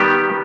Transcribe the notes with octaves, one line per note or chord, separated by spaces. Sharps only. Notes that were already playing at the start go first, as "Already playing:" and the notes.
Already playing: D#3 G3 B3 G4